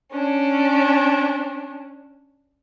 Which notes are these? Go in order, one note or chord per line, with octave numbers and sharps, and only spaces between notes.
C#4 D4